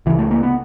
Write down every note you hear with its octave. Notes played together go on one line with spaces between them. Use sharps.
C#2 C#3 E3
A3
A#3
B3